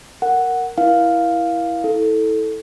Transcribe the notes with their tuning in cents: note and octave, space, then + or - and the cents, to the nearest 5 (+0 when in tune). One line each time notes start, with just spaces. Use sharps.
A#4 -5 F#5 +0
E4 +0 A#4 +40 F5 +0
E4 -25 A4 +0